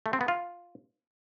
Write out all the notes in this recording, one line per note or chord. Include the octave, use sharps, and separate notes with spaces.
A3
C4
B3
F4